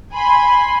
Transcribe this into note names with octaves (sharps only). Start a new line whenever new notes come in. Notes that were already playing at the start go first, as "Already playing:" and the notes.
G#5 B5 C6